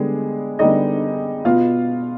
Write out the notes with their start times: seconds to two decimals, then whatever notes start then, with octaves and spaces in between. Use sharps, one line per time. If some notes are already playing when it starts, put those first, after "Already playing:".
Already playing: D3 G3 G#3 B3 G#4
0.59 D3 G3 B3 D#4 D#5
1.45 B2 B3 F4 F5